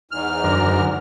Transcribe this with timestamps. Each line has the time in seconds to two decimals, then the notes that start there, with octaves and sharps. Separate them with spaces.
0.11 E2 G#2 F6
0.44 F#2 D3 A#4